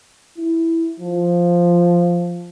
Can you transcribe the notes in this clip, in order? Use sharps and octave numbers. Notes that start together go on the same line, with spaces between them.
E4
F3